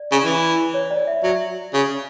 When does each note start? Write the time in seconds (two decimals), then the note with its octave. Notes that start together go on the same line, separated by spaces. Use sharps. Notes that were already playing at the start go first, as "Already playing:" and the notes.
Already playing: D5
0.12 C#3
0.25 E3
0.74 C#5
0.91 D5
1.07 E5
1.23 F#3 E5
1.74 C#3